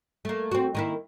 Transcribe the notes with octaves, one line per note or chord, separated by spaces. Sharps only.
A3 A#3
C4 F#4
D#3 A#3 E4